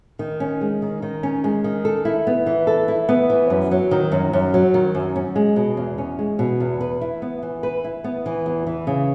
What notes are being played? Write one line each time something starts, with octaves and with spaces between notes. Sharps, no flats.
D#3
C#4
G#3
D#3
D#3
C#4
G#3
D#3
A4
E4
B3
E3
A4
E4
B3
E3
F#2
F#3
D#3
F#2
F#2
F#3
D#3
F#2
C#4
G#3
B2
E2
C#4
G#3
B2
E2
B4
E4
B3
E3
B4
E4
B3
E3
E2
E3
C#3